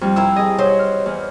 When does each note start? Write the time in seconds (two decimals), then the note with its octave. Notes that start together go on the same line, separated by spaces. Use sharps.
0.01 F2 G3
0.16 C4 E4 A#4 E6
0.36 G#4 D#5
0.59 F#3 C5
0.79 F6
1.06 E2